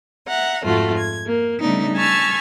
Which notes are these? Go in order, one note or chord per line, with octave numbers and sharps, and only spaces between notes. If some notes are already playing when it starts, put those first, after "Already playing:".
E5 F#5 A#5
F2 G#2 A3 F4 F#4
G#6
A#3
C#3 G3 A3 B3 D4 D#4
G#5 A5 B5 C#6 E6 F6